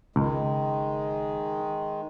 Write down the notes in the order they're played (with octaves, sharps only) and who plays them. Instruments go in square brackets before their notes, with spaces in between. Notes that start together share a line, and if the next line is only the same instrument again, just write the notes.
[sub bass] F#1 [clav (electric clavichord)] C#2 [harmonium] D#3 G#3